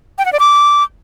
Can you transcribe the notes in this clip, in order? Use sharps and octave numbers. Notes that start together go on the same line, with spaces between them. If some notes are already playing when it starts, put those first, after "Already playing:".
G5
F#5
D5
D6